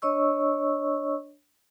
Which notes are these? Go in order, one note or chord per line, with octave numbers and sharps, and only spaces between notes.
D4 C#5 D#5 C#6 E6